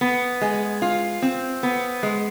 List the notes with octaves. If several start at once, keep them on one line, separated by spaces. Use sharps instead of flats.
B3
G#3
F4
C4
B3
G#3